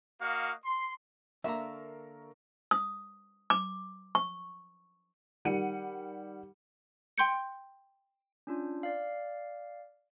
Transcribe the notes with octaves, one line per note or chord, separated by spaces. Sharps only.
A#3 F#4 D#5 F5
C6
D3 A#3 A#4 E5 F5 A#5 C#6
D#6
D6
C#6
D#3 G3 F#5 C#7 D#7
G5 C6 G6 C#7
C#4 D4 F4
D5 F5